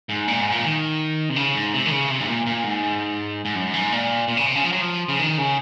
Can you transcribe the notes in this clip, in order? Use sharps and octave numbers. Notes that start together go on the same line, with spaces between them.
G#2
A#2
G#2
A#2
D#3
C3
C#3
G#2
C3
D#3
C#3
C3
G#2
A#2
A#2
G#2
G#2
F#2
G#2
A#2
A#2
C#3
C3
C#3
F3
F#3
F3
C#3
D#3
C#3